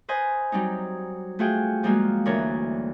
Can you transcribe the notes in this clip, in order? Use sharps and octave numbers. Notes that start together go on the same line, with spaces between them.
B4 C5 D#5 G#5
F#3 G3 C4 D#4
A3 F4 F#4 G#4 G5
F3 G3 G#3 A#3 F4 F#4
D2 E3 D4 A#4 C#5